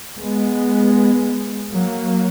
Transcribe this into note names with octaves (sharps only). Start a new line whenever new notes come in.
G#3 B3
F#3 A#3